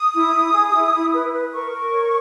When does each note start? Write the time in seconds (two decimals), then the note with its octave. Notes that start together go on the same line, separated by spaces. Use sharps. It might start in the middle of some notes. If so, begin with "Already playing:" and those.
Already playing: D#6
0.13 E4
0.33 E4
0.53 G#4
0.73 E4
0.93 E4
1.12 B4
1.33 B4
1.52 A#4 C#6
1.72 A#4
1.92 C#5